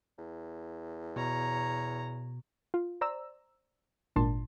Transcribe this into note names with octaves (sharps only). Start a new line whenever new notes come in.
E2
B2 C#5 A#5
F4
C5 D5 A#5 E6
G#1 A#2 D4 A5 C6